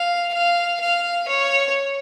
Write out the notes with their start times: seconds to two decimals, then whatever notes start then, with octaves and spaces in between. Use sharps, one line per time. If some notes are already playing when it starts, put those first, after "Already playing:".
Already playing: F5
0.34 F5
0.81 F5
1.28 C#5